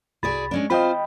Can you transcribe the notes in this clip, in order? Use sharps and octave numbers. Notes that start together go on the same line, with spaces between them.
C2 F#4 G#4 D5 B5 A6
G#3 C#4 D4
C4 F4 C5 D#5 G5 B5